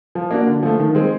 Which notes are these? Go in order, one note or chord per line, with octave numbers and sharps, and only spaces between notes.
F3
A#3 D4 F#4
D3
F3 A3
D#3
G#3 C4